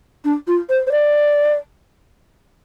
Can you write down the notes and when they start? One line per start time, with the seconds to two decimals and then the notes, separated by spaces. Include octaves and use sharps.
0.24 D4
0.47 F4
0.69 C5
0.87 C5
0.91 D5